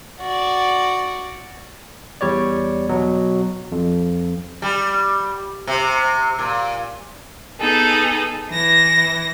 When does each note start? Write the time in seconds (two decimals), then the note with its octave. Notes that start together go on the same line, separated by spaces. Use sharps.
0.21 F#4 D5
2.21 E2 G3 C#5 D5
2.89 B2 F#3
3.72 F2
4.62 G3
5.67 C3
6.39 A#2
7.60 B3 D#4 G#4 A4
8.49 E3 A#6